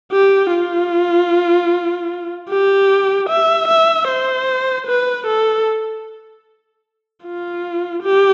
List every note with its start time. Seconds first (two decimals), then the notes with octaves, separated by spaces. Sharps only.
0.12 G4
0.52 F4
2.49 G4
3.29 E5
3.68 E5
4.08 C5
4.87 B4
5.27 A4
7.25 F4
8.03 G4